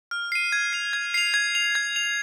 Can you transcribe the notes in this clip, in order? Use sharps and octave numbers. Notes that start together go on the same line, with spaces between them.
F6
C7 D#7
G#6
C7 F7
G#6
C7 F7
G#6
F7
G#6
F7